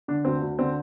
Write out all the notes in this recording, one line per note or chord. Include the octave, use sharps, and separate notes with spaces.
D3 D4
D2 C4
D2
D3 C4